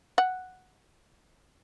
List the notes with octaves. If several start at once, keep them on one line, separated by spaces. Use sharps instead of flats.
F#5